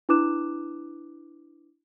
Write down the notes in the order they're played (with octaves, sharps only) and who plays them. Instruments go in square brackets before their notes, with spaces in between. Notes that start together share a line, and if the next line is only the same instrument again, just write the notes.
[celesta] D4 E4 B4 D6 F#6 E7